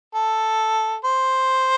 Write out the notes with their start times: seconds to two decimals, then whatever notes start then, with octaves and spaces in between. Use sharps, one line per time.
0.15 A4
1.05 C5